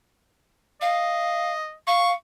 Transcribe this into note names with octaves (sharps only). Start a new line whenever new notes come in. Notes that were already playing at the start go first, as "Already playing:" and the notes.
D#5 F5
F5 C#6